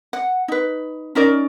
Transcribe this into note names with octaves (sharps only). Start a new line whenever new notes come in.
F#5
D#4 B4
C#4 D#4 A#4 D5